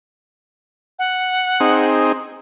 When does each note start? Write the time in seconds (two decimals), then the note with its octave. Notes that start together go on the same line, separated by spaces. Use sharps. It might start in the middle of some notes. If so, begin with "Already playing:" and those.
0.99 F#5
1.60 C4 D#4 G#4